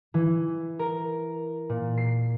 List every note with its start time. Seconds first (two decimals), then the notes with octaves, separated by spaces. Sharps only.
0.14 E3
0.79 A#4
1.69 A#2
1.98 C7